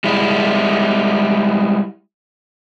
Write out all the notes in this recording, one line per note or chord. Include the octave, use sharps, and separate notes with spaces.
G3 G#3 E4